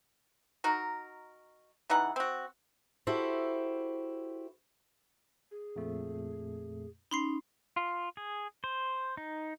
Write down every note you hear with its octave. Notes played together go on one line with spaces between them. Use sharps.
D#4 F#4 A#4
C#3 E3 D#4 F#5
C4 F#4
E4 F#4 G4 A4 C5
G#4
F2 A#2 A3
C#4 D#4 B5 C6 C7
F4
G#4
C5
D#4